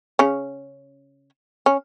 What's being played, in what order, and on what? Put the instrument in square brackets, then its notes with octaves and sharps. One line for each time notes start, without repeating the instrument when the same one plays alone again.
[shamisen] C#3 C#4
C#4